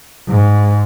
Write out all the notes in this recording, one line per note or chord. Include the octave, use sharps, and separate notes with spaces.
G#2